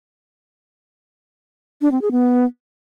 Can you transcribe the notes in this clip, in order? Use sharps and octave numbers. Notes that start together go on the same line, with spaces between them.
D4
C4
G#4
B3